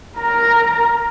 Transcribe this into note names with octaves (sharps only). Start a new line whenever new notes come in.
A#4 A#5